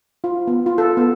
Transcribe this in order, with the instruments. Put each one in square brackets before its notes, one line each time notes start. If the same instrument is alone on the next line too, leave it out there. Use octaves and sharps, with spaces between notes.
[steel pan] F4
B3
F4
A4
B3